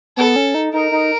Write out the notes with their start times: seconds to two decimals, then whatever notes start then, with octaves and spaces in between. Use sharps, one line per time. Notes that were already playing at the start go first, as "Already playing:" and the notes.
0.17 B3 A4
0.36 C#4
0.55 D#4
0.73 D#4 A#4
0.92 D#4